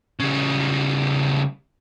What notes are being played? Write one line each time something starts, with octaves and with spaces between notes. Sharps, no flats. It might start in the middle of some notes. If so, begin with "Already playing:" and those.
C#3 G3